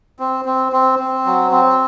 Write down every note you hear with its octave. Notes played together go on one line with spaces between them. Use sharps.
C4
C4
C4
C4
F#3
C4